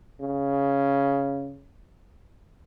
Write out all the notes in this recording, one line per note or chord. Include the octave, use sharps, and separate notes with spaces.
C#3